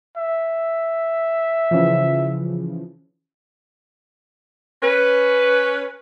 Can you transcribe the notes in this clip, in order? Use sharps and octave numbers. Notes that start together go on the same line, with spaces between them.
E5
C#3 E3 F3
C#4 B4